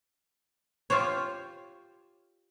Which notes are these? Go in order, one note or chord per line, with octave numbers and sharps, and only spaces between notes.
F4 G4 C5 C#5